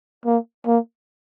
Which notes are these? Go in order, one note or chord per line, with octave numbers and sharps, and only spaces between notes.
A#3
A#3